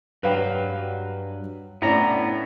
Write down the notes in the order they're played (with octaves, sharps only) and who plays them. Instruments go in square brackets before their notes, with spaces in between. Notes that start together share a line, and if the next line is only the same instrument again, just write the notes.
[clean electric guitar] G2 F#3 [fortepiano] B4 F5 G5
[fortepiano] A2 C#4 D4 [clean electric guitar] B3 A#5